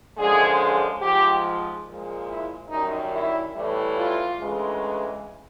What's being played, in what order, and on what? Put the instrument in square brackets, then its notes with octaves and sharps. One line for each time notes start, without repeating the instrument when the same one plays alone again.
[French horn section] F#2 D3 F3 G#3 G#4
G#2 F3 G#3 G4
A#2 F3 G#3
E4
F#2 D#3 G3 D#4
E4
A2 E3 G3
F4
D2 C#3 E3 G#3